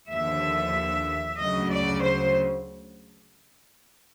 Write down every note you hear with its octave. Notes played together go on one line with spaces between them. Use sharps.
D#2 D3 F3 E5
D2 C#3 F#3 D#5
D5
C5